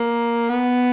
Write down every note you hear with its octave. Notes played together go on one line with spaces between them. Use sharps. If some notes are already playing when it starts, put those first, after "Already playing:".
Already playing: A#3
B3